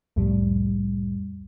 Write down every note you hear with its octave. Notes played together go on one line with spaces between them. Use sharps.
C2 F2 A2 G3